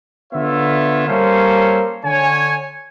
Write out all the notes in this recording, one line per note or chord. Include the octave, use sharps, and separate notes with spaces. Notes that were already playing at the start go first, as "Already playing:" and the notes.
D3 B3 F4 C#5 E5
G3 A#3 C#4 A4 C5 C#5
D3 C#5 G#5